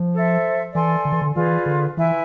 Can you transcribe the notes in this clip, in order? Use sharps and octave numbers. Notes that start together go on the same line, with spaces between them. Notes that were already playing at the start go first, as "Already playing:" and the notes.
Already playing: F3
A4 C5 E5
E3 A4 D5 G#5 C6
D3
E3
D3
E3 F4 G#4 B4 D5
D3
E3 E4 B4 E5 G#5